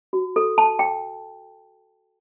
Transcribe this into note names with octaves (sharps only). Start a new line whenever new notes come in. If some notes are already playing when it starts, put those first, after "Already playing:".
F#4
A4
A5
G5